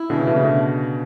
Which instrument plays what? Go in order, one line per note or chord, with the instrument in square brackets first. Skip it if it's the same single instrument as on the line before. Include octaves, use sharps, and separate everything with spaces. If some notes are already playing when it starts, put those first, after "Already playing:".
Already playing: [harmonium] E4
[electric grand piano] B2 D3 [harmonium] E3
[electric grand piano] C#3
[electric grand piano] B2 [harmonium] A3
[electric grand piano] C#3
B2 D3